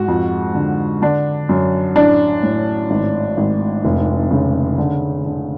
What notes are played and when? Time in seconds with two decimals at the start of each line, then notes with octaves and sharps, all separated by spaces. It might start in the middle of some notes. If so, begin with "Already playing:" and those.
Already playing: G#2 F#4
0.08 F2
0.54 D3
1.02 D3 D4
1.49 F#2
1.96 A1 D4
2.43 A2
2.90 G#1
3.37 G#1
3.84 F1
4.31 C#3
4.78 D3
5.25 D3